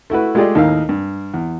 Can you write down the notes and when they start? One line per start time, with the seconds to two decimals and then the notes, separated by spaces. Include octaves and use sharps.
0.10 A3 E4 F#4 B4
0.35 G#3 A3 F4 G4 D5 D#5
0.55 D#2 A2 D#4 A#4 F5
0.89 G2
1.34 E2